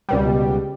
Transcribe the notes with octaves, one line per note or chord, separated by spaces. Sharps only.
C#2 B2 G3